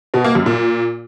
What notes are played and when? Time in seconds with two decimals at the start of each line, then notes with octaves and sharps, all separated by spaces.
0.14 B2
0.24 A#3
0.35 F#2
0.46 A#2